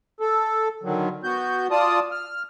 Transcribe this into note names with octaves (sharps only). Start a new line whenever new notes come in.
A4
D3 D#3 F#3
B3 F#4 G6
F4 D5 A5 D#6
F6